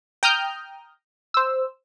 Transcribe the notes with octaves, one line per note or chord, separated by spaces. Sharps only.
G5 A#5 D#6 F6 G6
C5 E6